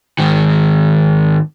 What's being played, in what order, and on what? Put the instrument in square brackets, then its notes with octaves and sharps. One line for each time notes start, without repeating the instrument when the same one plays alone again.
[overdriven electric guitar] G#2 D#3